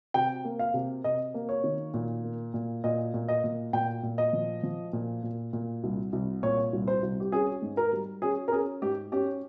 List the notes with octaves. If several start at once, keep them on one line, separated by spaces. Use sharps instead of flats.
C3 G5
A#3
F5
C3
C3 D#5
A#3
C#5
D#3
A#2
A#3
A#2
A#2 D#5
A#2
D#5
A#2
A#2 G5
A#2
D#5
F3
F3
A#2
A#2
A#2
C2
C2
A#2 C#5
C2
C5
C2
G4
C#4 G#4
G#2
A#4
G3
C#4 G#4
A#4
C#4 G#4
G#2 G4
C#4 G4